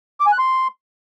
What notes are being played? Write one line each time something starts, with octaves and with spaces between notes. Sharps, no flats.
D6
G#5
F#6
C6